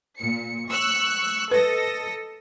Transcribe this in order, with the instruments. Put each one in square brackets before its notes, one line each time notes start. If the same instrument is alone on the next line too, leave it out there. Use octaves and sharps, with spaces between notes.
[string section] A#2 C#7
C#6 E6 F#6
[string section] A4 D#5 A#6 [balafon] B4